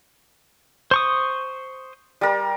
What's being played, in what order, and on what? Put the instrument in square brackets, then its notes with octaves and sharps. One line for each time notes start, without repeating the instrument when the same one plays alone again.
[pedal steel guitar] C5 C#6 D#6
[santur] G3 A#4